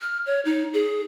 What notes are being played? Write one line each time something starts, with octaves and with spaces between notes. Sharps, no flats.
F6
C#5
D#4
G#4